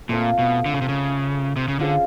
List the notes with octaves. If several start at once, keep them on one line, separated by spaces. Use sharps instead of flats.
A#2 A3 C4 F4
B2
D3
C#3
C3
C#3
C3
C#3
D3 C#4 F4 G#4 C5